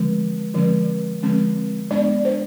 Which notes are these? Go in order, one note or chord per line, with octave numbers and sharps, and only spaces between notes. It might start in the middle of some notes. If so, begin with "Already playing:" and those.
Already playing: D3 F3 G#3 C4
D3 F3 G#3 C4
D3 F3 G#3 C4
G#3 B3 D4 D5
C5